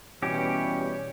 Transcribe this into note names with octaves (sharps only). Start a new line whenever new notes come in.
B2 E3 G3 C#4 G4